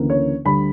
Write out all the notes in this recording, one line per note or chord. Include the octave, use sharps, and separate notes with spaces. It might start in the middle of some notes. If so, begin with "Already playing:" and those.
Already playing: D2 C#3 E3 A#3 C#4
C#5
D2 D3 G3 B5